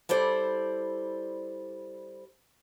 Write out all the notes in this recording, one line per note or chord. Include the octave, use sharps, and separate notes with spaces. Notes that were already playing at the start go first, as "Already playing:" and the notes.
G3 E4 A4 C5 D5